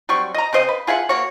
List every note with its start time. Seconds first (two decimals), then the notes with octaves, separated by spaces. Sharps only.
0.09 F#3 G3 C4 C#6
0.34 D#5 A#5
0.53 C#3 C4 C5 D#5
0.69 B4
0.87 F4 G#4 E5 F#5
1.09 A#3 F#4 C#5